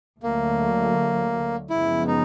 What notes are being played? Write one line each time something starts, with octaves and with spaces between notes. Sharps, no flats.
D2 D3 F#3 A3 A#3
F#2 C#3 F3 G#3 B3 E4
D#4